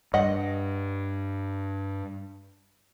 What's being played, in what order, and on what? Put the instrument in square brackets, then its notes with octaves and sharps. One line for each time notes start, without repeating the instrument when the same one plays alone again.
[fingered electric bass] G2 [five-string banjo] D#5 F#5